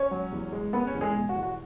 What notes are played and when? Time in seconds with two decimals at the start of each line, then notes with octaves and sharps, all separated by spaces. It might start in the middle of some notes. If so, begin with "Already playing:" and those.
Already playing: C#4 C#5
0.11 F#3
0.32 E2
0.52 G#3
0.73 G#3 B3 B4
0.87 C#4 C#5
0.95 E2
1.01 G#3 G#4
1.15 B2
1.29 F#4
1.35 E2
1.43 F#4